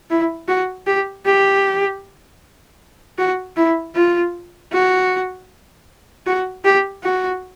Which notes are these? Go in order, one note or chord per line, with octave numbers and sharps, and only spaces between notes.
E4
F#4
G4
G4
F#4
E4
F4
F#4
F#4
G4
F#4